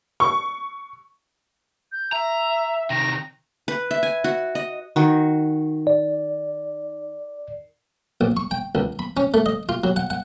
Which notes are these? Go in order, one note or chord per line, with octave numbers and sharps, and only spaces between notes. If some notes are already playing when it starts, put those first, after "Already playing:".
C#6
G6
E5 A#5
C3 D#3 A#6
B4
E5
G#5
F#4
D#5
D#3 F#4
D5
A#1
C#6
G5
C#2
B5
C#4
A3
D#5
F4
F#3
F#5
F#5